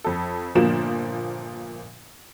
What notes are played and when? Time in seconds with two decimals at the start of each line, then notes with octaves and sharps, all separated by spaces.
0.04 F2 A4
0.55 G1 A#2 F3 A#3 E7